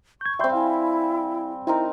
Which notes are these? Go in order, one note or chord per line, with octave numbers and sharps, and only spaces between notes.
C#6 G6 G#6
G3 C4 E5 C6 G6
E4 F5 G#5
C4 D#4 E4 A#4